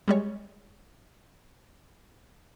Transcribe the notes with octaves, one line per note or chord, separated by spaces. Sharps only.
G3 G#3 C#5